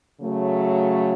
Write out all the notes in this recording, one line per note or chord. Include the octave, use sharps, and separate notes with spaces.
C#3 F#3 A3